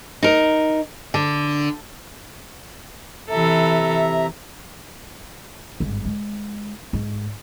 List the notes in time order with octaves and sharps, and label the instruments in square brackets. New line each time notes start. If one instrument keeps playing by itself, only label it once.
[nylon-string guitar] D#4 A#4
D3
[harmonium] C3 E5 A#5 [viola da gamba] E3 A4
[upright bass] G#1 G2
G#3
G#2